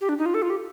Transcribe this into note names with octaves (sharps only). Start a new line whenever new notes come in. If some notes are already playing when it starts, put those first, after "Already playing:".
G4
D4
D#4
F4
A4
F4
G4